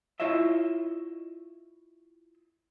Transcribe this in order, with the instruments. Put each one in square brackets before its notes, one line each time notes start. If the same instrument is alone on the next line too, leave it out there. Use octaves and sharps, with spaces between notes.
[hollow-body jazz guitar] E4 F4 C#5 D#5 E5